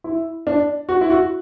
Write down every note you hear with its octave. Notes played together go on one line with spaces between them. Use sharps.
E4
D4
F#4
E4
F#4